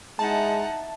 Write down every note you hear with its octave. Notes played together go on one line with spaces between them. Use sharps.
G#3 D#4 E4 F#5 A5